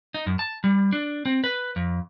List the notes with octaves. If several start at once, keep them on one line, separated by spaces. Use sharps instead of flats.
D#4
F#2
A5
G3
D4
C4
B4
F2